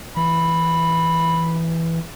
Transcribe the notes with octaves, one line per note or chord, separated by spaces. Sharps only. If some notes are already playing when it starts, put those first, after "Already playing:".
E3 B5